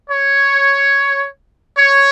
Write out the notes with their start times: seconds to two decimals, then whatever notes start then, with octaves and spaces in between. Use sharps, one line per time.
0.10 C#5
1.78 C#5